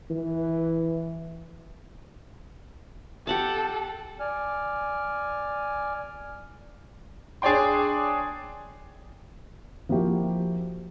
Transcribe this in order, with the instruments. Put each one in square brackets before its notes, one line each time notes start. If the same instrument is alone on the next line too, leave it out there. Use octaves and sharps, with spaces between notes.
[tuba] E3
[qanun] G4 F#5 A5 [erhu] A4
[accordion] D5 G#5 F6
[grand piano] D4 G#4 C#5 D5 G5 C6
[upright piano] F3 A#3 E4 F#4 G4